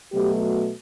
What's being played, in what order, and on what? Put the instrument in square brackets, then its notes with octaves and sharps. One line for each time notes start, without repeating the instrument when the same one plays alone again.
[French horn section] B2 F#3 A3 G4